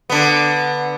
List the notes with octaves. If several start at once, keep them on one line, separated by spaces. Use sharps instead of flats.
D3 B3